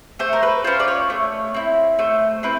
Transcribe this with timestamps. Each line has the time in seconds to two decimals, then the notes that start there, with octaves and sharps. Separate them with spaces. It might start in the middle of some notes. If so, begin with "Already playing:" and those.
0.19 A3 C5
0.33 A#4
0.43 B4
0.64 C#4 F4 C5
0.80 D5
0.88 C#5
1.10 A3
1.54 C4 E4
1.99 A3 C5
2.43 C4 E4 B4